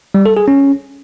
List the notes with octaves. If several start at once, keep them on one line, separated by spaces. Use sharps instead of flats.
G3
A4
G#4
C#4